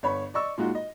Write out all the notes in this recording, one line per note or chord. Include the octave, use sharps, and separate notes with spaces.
G1 C#5 B5
D5 D#5 C#6 E6
A#2 G#3 D#4 F4 F#4
D#5